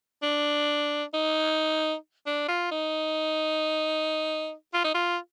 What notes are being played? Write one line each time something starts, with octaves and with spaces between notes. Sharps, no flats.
D4
D#4
D4
F4
D#4
F4
D#4
F4